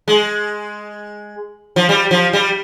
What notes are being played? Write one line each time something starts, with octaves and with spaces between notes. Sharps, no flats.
G#3
F3
G3
F3
G3